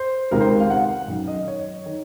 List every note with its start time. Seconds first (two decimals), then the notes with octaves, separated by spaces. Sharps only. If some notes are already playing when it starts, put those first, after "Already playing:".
Already playing: C5
0.31 C#2 C3 D#3 A#4
0.41 C5
0.60 F5
0.70 F#5
1.08 F#2 D#3
1.27 D#5
1.48 C#5
1.86 D#3